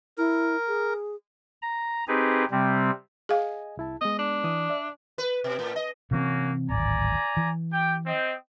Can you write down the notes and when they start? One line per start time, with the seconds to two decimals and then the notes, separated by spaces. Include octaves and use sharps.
0.18 E4 A#4
0.68 G#4
1.62 A#5
2.08 C4 D#4 G4 G#4 B4
2.51 C3 G3 C4
3.29 G#4 D#5 F5 G#5
3.77 C2 E4 A5
4.01 G#3 B3 D#5
4.19 D4
4.44 E3 D#6
4.70 D5 E5
5.18 B4
5.44 B2
5.59 A2
5.76 D#5
6.11 C3 E3 A#3 C4 C#4 F#4
6.69 D1 G#1 D5 G#5 A#5
7.37 E3
7.71 G4 G5
8.06 C4 D#5 G5